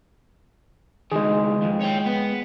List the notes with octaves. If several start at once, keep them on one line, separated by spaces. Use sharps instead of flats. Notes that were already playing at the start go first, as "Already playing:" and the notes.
C#2 D#3 G#3 G#4
F2
C#5 G5
B3